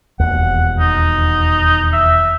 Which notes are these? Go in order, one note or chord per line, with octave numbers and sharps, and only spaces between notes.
E1 D#2 F#5
D#4
E5